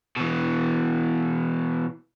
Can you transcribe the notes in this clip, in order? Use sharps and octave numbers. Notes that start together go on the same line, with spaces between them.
B2 E3